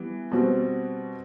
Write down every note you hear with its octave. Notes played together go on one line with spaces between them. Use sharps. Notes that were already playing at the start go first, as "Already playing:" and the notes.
Already playing: E3 G3 B3
B2 G3 C4 F#4